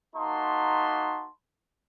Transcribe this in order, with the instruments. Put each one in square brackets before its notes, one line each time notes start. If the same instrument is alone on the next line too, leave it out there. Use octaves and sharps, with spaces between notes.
[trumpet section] A#3 D#4 F#4 A5 B5 C6